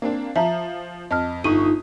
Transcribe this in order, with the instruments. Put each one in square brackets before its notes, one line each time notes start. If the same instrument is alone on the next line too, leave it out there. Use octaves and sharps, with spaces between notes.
[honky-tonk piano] A#3 C4 D4
[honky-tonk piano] F3 [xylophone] E5 A5 A#5
[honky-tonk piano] F2 [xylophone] D#5 A5 F6
[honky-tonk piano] G1 C#6 D#6 [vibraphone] D#4 F4 [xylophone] D#7